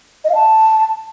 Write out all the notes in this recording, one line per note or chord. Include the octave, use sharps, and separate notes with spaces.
D#5
F5
A5